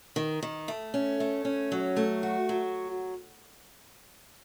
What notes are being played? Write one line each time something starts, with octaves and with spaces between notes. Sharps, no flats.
D#3
D#3
A3
C#4
A3
C#4
F#3
A3
F#4
F#3